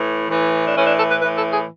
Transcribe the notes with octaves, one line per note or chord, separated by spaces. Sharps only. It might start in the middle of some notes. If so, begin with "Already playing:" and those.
Already playing: A2 E3
A2 E3
D4
A2 E3 C#4
D4
A4
B4
A2 E3 B4
A4
G#4